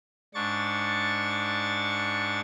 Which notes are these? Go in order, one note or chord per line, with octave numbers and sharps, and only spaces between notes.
G#2 D4 C#6 A6